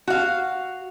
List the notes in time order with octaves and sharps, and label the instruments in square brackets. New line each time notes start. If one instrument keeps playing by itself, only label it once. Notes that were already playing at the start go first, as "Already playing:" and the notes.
[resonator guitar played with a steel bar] F#4 F5